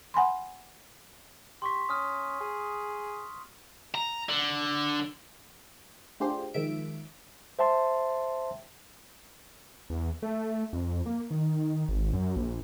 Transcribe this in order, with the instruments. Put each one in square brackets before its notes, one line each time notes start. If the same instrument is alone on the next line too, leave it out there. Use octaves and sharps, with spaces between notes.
[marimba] F#5 G#5 B5 C6
[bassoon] G4 [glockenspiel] C6 C#6 B6
[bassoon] C#4 [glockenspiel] D#6 F6
[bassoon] G#4
[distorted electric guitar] A#5
D3
[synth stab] A3 D4 F4 G4 G#4 C5
D#3 F3 G#3 E5 D7
[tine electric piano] C5 E5 G5 A5 C6
[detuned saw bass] E2
A3
F2
A#3
D#3
G#1
F#2
A#1